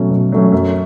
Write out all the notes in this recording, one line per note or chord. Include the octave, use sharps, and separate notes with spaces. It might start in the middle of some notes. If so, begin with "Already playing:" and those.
Already playing: B2 F#3 A3 C#4
B2
F#3 A3 C#4
F#2